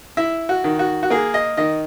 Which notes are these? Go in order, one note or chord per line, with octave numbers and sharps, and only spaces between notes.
E4 E5
F#4
D#3
F#4
F#4
A#3 G#4
D#5
D#3 D#5